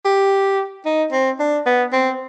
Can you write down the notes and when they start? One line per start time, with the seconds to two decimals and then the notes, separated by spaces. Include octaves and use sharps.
0.05 G4
0.85 D#4
1.12 C4
1.40 D4
1.66 B3
1.92 C4